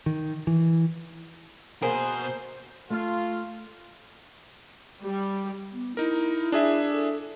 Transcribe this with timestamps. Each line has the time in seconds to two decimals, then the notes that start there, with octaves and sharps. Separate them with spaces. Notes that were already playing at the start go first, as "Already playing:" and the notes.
0.06 D#3
0.47 E3
1.82 B2 A#3 G#4 A#4 C5
2.90 A3 F4
5.04 G3
5.73 B3
5.97 D#4 E4 A#4
6.52 D4 G#4 E5
6.92 A4